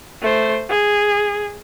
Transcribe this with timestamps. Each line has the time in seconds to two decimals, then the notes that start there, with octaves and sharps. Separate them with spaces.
0.22 A3 C5
0.69 G#4